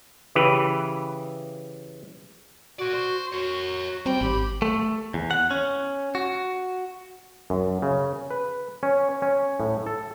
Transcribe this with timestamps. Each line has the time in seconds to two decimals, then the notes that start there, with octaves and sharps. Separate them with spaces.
0.35 C#3 E3 G4 B4
2.79 F#4 A#4 D5
2.94 C5
3.32 F#4 A#4 C#5
4.06 G2 G3 C4 G5
4.21 G#1 E3 G4 B5
4.62 A3
5.14 E2
5.31 F#5
5.51 C#4
6.15 F#4
7.50 F#2
7.82 C#3
8.30 B4
8.83 C#4
9.22 C#4
9.60 A2
9.86 A4